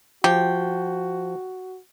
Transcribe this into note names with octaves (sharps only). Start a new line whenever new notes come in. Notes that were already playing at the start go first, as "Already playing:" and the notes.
F3 F#4 G4 G5